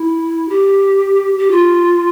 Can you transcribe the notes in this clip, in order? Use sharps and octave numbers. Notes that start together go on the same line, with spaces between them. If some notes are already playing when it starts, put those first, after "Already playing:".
Already playing: E4
G4
G4
F4